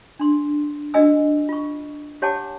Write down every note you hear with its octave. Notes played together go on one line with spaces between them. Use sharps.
D4 C6
D4 F#4 D#5 G#5 E6
F4 C#6
G4 C#5 F#5 G#5 A5 D6